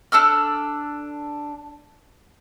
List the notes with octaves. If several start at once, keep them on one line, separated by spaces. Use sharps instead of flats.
D4 A4 E6 F6